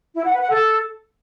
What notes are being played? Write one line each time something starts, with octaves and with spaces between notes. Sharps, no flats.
E4
F#5
B4
F#5
A4